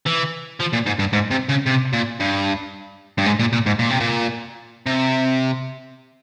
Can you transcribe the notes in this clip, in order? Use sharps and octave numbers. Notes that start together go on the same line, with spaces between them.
E3
F3
A#2
G#2
G2
G#2
C3
C#3
C3
A#2
G2
G2
G#2
A#2
A#2
G#2
A#2
C3
A#2
C3